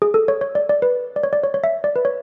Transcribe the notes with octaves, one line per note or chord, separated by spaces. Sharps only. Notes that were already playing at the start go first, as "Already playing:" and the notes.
G#4
A4
C#5
C#5
D5
D5
B4
D5
C#5
D5
C#5
C#5
E5
D5
B4
C#5